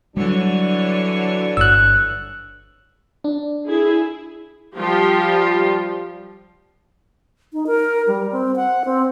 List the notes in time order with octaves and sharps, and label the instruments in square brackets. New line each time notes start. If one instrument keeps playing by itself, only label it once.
[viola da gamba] D3 E3 C#5 [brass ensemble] F#3 D4 [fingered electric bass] G3
[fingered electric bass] G1 G2 [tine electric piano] E6 F#6
[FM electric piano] D4
[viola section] E4 G#4
F3 G3 F4 G4
[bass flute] D#4
A#4
G3
C4
F#5
C4